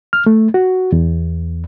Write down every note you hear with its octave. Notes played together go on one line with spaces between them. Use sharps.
F6
A3
F#4
E2